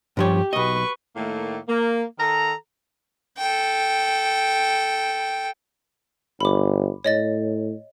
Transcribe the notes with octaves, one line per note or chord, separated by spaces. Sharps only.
G2 F3 G4 C#5
B1 B4 D#5 C#6
A2 D#3 A3 A#3
A#3
D#3 A4 A#5
A4 G5
G1 B5 D6
A2 C#5 D#5 A6